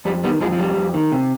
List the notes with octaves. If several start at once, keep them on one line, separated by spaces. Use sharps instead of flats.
F2 G3
D#3 G3 B3
F2 F3 G#3
F3
F2 G3
F2
D#3
C3